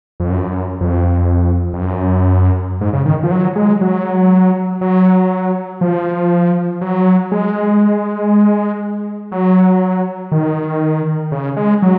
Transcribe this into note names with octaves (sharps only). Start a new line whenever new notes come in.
F2
F#2
F2
F2
F#2
G#2
C#3
D#3
F3
F#3
G#3
F#3
F#3
F3
F#3
G#3
F#3
D#3
C#3
G#3
F#3